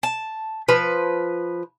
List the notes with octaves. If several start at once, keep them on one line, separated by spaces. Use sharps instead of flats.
A5
F3 B4